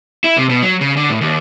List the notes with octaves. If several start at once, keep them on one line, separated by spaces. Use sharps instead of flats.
E4
C3
B2
F#3
C#3
D3
A2
D#2